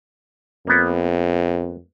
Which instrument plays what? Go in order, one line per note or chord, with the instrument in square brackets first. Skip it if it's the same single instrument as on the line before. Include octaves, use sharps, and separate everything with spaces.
[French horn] F2 [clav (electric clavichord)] A#3 B3